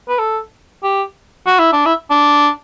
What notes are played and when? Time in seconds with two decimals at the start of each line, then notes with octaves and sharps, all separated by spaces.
0.09 B4
0.19 A4
0.84 G4
1.47 F#4
1.59 E4
1.73 D4
1.86 E4
2.11 D4